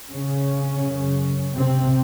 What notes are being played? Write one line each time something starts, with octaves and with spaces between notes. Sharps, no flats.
C#3 C#4
F#2 C#3
C3 C4